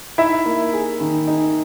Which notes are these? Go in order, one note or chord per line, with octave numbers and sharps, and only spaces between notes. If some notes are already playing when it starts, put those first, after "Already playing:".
D#4 E4 E5
A#3
G#4
D#3
D#4